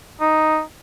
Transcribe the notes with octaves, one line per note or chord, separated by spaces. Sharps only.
D#4